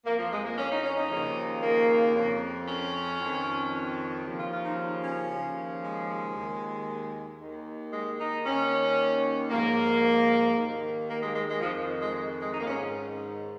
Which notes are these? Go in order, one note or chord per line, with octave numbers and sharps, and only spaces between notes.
F2 F3 A#3
F3
G#3
A#3
C#4
D#4
C#4
D#4
D#2 C#3 F3
A#3
F2 F3
C#4
F2 D#3
D#2 C#3 F3
F4
F4
D#4
C#4
D#2 C#3 F3
G#3
D#2 D#3
D#2 D#3
G#3
D#4
D#2 D#3 C#4
G#2 F3 A#3
D#2 D#3
A#3
G#3
G#3
G#3
F2 D#3 F3
G#3
G#3
G#3
D#4
A#3
G#2 D#3 C#4